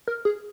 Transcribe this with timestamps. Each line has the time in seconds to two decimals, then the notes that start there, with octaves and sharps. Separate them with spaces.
0.07 A#4
0.25 G#4